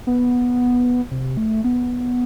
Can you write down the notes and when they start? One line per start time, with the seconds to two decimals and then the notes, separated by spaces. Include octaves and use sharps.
0.07 B3
1.11 C3
1.37 A3
1.64 B3